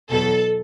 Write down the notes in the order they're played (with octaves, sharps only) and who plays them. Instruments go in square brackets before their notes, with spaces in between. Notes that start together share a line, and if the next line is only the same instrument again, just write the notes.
[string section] E2 B2 F#3 A4